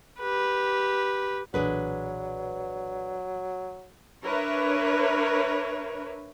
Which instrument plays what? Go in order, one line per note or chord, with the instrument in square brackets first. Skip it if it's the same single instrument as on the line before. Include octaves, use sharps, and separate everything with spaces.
[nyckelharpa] G4 B4
[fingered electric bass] B1 A#2 E3 [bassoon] F#3 [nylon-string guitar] D4 G#4 B4
[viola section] D4 A#4 B4 C#5 E5